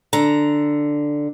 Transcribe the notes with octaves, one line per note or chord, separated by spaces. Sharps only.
D3 A#5